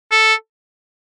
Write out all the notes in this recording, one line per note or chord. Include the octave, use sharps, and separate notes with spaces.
A4